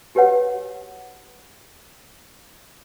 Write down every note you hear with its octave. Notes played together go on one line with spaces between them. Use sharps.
F#4 G4 B4 C#5 F#5